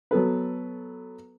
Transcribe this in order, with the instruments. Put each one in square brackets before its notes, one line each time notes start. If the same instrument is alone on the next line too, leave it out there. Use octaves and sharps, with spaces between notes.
[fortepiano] F#3 B3 A4 B4